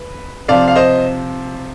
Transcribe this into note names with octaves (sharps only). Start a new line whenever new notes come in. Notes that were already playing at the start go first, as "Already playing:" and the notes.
Already playing: B4
C3 F3 D5 F5
F5
C5 D#5